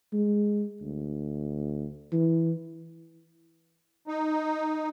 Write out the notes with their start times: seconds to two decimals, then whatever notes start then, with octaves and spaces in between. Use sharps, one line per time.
0.13 G#3
0.81 D2
2.12 E3
4.08 D#4